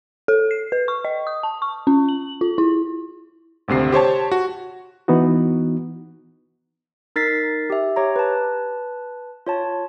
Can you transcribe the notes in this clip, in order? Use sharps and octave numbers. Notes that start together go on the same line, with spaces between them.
A4
C7
B4
C#6
D#5
D#6
A5
C#6
C#4
F#7
F4
E4
G#1 D2 C3 C7
G4 C5 C#5 A5
F#4
E3 B3 D#4 F#4
D#4 A#4 A6 B6 C7
G4 E5
G4 C#5 A#5
B4 A5
F4 C#5 A5